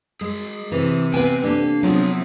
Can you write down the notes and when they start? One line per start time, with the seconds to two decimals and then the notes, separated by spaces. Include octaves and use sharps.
0.21 G#3 G#4 A#4
0.72 C3 E3
1.14 B3 C4 B4 F5 G5 G#5
1.44 A#3 D4 G4 A4
1.83 E2 C3 F3 F#3 B3 C4 F4 G#4